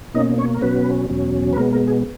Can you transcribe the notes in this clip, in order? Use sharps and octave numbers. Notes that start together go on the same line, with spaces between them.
B2 A#3 C#4 D#4 D#5
C#4 C#5
A#4
B2 F#3 B3 C#4 B4
E2 B2 F#3 C#4
B4
B2 G#3 A#3 B3 A#4
A#3 A#4
G#4